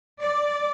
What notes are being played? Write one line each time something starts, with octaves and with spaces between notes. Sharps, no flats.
D5